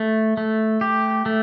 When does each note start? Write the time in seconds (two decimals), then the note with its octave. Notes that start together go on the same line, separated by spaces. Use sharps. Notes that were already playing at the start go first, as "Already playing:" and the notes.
Already playing: A3
0.37 A3
0.81 G4
1.26 A3